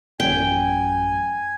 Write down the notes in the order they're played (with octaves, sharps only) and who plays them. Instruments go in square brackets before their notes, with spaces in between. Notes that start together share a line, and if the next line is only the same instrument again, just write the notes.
[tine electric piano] A1 F#2 [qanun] G5 [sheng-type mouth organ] G#5